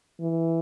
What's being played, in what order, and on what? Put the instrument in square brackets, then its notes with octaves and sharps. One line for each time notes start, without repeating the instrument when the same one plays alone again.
[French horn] E3